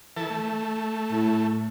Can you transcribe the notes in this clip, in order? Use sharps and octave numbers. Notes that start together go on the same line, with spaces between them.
E3 A4
A3
A2